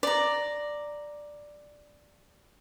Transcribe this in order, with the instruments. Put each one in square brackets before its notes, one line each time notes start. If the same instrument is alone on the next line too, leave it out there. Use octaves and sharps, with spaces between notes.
[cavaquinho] D5 A#5